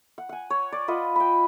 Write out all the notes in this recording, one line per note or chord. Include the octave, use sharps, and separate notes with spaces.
F#5
F#5 G#5
C#5
D5
F4 B4 D#5 F#5
G5 B5